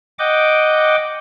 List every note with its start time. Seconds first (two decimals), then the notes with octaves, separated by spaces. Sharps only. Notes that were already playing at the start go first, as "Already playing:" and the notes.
0.19 D#5 F#5 G5 D6